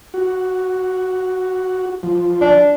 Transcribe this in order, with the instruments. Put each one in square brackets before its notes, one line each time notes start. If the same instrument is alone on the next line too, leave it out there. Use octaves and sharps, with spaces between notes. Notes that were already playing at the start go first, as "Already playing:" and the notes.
[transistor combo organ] F#4
F3
[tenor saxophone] D4